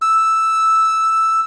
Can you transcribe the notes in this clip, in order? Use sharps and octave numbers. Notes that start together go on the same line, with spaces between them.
E6